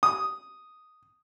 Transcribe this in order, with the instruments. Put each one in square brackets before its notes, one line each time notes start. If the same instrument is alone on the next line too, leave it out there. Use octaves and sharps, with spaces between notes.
[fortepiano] D#6